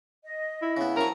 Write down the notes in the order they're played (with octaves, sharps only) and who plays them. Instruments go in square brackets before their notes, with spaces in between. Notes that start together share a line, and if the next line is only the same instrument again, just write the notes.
[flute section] D#5
[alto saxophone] E4
[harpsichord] C#3 B3
[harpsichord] F#2 F3 C#6 [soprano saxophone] A#4 [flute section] G#5 A5